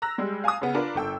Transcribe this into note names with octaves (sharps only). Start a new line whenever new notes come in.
A#5 E6 F#6 A#6
G3 G#3
F5 G#5 A5 D6 D#6
C#3 B3
D4 F4 A#4 B4
G1 A4 G5 E6